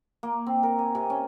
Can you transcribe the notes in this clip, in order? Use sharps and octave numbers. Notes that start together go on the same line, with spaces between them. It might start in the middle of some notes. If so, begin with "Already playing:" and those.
A#3
C4
A#4
G#5
C3
C#4